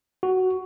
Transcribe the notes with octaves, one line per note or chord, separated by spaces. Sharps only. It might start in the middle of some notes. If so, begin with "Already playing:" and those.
F#4